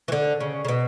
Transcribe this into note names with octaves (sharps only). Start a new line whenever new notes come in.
E3
D3
C#3
C#3
B2